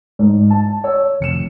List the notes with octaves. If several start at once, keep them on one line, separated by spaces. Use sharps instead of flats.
G#2
A5
C#5 E6
F1 C#7 E7